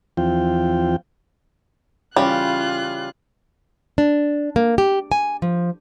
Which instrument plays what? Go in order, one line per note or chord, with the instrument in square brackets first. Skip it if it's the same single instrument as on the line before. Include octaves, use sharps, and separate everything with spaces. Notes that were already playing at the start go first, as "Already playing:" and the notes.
[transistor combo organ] E2 F3 C4 F4 G5
[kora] C#3 E3 C#4 [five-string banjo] G3 [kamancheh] F4 F#6
[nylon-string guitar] D4
A#3
G4
G#5
F3